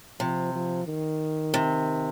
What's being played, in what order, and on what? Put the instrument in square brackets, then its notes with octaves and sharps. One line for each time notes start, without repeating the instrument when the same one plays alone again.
[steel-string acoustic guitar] C3 [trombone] F3
[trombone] F3
D#3
[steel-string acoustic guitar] C3